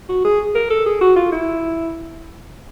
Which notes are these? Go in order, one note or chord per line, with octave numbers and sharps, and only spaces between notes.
F#4
G#4
A#4
A4
G#4
F#4
F4
E4